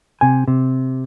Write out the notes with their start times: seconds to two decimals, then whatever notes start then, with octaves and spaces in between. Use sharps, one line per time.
0.21 C3 G#5
0.48 C3